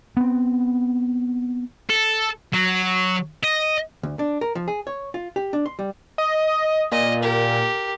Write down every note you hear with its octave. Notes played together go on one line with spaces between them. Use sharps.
B3 C4
A4
F#3
D#5
D2
D4
A#4
F3
G#4
C#5
F4
G4
D4
C6
G3
D#5
A#2 D#5
G4 A#4